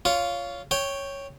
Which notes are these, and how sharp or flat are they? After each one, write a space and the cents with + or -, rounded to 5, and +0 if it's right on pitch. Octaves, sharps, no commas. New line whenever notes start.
F4 -5 C#5 +20
C#5 +0 G5 +0